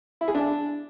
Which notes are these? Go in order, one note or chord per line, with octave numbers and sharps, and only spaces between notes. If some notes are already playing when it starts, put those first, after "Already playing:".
E4
G#4
D4